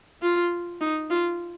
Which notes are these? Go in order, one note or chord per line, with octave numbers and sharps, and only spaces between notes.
F4
D#4
F4